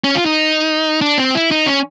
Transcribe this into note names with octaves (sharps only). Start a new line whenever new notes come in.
C#4
F4
D#4
D4
C4
E4
D#4
C#4